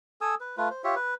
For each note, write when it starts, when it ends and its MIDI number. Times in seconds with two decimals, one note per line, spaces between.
0.21 0.35 69
0.21 0.35 80
0.21 0.35 87
0.21 0.35 88
0.41 0.56 71
0.57 0.69 57
0.57 0.69 65
0.57 0.69 71
0.70 0.82 72
0.84 0.95 65
0.84 0.95 67
0.84 0.95 73
0.84 0.95 76
0.96 1.14 71